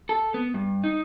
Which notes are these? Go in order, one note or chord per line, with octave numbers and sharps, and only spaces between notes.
A4
B3
G2
D#4